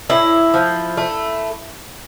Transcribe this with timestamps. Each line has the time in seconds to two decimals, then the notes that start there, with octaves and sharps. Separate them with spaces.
0.10 A2 E4
0.54 F3
0.97 A3